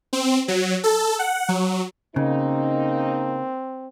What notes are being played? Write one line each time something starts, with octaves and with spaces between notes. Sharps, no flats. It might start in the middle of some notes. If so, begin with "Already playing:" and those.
C4
F#3
A4
F#5
F#3
C#3 A#3 C4 D#4